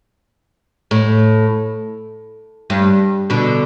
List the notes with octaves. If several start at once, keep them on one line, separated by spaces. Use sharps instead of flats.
A2
G2
B2 D3